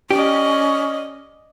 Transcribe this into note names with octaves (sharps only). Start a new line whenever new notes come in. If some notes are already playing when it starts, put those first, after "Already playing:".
C#4 G4 D5 D#5